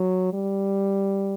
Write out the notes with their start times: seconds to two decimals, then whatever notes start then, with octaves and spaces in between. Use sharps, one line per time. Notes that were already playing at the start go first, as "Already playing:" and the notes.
Already playing: F#3
0.33 G3